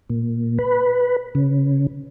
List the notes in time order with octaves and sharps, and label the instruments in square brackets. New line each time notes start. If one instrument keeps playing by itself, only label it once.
[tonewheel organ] A#2
B4
C#3